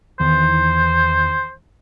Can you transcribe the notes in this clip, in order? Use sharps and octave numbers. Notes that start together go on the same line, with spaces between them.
E2 D#3 E3 C5